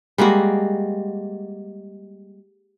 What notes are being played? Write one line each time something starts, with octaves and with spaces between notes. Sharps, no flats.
G3 G#3 A#3 F#4